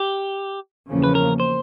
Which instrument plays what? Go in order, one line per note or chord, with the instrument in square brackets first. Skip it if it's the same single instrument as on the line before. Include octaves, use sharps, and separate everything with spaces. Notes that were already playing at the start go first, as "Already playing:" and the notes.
Already playing: [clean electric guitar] G4
[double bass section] E2 C#3 F3 A#3 C#4
[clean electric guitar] B4
A#4
C5